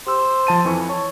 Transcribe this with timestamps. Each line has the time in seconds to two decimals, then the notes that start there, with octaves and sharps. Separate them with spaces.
0.07 G4 C5 E6
0.47 F3 A5 D#7
0.65 F2 E3 C#6
0.89 C#5 A5